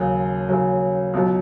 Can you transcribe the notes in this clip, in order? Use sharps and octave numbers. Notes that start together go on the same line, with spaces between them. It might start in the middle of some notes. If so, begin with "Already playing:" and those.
Already playing: D#2 C#3 F#3
D#2 C#3 F#3
C#2 B2 F#3